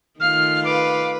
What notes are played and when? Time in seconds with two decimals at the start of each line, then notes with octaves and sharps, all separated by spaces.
0.20 D#3 A3 F4 F5 F6
0.65 B4 D6